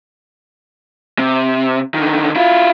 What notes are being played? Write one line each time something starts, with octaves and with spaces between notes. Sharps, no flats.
C3
D3 D#3
E4 F4